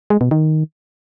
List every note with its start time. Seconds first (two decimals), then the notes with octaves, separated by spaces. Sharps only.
0.10 G#3
0.21 B2
0.31 D#3